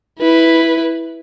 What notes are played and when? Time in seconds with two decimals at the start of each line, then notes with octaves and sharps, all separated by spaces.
0.20 E4 B4